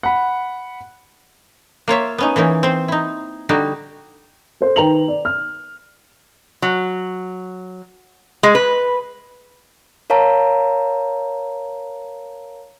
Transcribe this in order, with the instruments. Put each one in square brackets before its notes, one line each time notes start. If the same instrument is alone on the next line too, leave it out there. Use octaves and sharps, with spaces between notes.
[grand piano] F#5 B5
[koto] A#3 F4 C#5 E5
B3 C#4 D#4
E3 A#3 C#4 D#4
C4 C5
D#4 E4
D3 G3 D#4 F#4
[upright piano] A4 C5
D#3 B4 G5 A#5 F7 F#7
D5
F6
[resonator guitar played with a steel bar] F#3
G#3
B4
[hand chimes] A#4 C#5 F5 A5 A#5